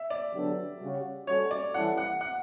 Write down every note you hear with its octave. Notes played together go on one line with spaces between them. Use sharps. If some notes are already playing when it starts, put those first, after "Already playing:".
Already playing: E5
D5
D3 F#3 B3 D4 G4
C#3 G3 C#4 F#4
G3 C#4 F#4 A4 C#5
D5
E3 G3 C#4 E4 A4 F#5
F#5
F#5